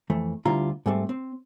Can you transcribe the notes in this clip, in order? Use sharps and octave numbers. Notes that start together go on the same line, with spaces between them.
F2 E3 A3
D2 D3 G3 E4 F4 A#5
G#2 G3 A3 C4
C4